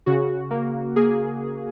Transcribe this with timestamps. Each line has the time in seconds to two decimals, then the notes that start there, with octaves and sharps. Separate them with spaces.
0.06 C#3 F#4
0.51 A#3
0.96 A#3 G#4